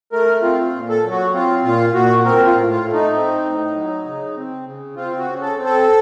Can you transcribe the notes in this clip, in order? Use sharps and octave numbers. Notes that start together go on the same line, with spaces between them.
A3 A#4
C4 F4
F4
A#2
A4
F#3
F#4
C4 F4
A#2 F4
A#2 F#4
C4 A#4
F4
A2
F4
A3
D#4
C4
A2
F#3
C#3
C4
C#3
C4 F4
F#4
C#3
A4
C4
A4